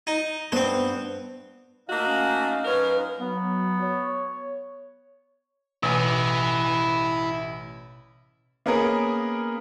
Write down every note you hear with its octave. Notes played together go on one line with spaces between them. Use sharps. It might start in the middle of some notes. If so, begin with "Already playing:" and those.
D#4
G2 B3 C4 C5
A3 A#3 D#4 F#4 D#5 F5
C#4
F#2 C#4 A#4 B4
F#3 B3
C#5
A1 B2 E4 G#5
A#3 B3 C#4 G#4 A#4